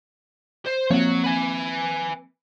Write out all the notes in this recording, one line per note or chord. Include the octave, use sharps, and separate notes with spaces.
C5
F3 A#3 C4 C#5 F#5
B4 G#5